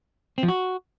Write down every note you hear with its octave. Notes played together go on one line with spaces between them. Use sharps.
C4
F3
F#4